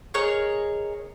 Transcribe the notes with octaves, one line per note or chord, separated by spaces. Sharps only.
G#4 A#4 C#5 D#5